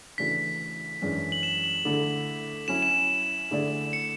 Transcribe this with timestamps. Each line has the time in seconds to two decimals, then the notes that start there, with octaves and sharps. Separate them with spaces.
0.18 C#3 E3 A3 D4 F#4 B6
1.02 F#2 E3 G#3 D4
1.32 F#7
1.43 E7
1.64 F#7
1.85 D3 A3 E4 A4
2.68 F#3 C#4 E4 E7
2.82 E7
3.51 D3 A3 E4 G#4 D5
3.93 C#7